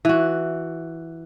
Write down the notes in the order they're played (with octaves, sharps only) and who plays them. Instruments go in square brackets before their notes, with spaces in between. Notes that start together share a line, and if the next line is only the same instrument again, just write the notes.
[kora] E3 F#4